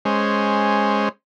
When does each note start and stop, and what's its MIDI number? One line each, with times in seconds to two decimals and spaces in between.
0.05 1.09 56
0.05 1.09 61
0.05 1.09 72